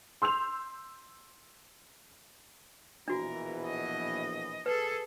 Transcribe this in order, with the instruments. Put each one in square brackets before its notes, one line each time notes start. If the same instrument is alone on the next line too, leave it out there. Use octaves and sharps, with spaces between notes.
[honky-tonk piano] C6 E6 G6 F7
[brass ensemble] A#1 B2 E3 [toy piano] D4 F#4 [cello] A#4
[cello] D#5
[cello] G#4 A4 [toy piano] B4